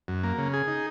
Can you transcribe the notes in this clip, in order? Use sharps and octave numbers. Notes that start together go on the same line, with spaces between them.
F#2
A#3
C#3
G#4
D#4